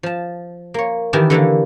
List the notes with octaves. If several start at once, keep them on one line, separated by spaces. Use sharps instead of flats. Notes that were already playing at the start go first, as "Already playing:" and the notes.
F3 A5
A#3 C#5
D#3 E3 G4 B4 G#5 A5
D3 E3 A3 A#3